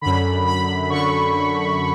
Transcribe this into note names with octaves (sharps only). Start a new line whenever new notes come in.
F#2 D3 B5
B5
F#2 D3 C#6